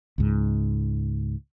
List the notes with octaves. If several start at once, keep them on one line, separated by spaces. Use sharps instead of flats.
C#2 G#2